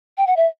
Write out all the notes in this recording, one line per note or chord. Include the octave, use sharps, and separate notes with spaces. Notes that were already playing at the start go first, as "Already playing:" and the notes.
G5
F#5
E5